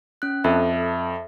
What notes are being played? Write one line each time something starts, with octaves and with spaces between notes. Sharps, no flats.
C#4 F#6
F2 A4 E5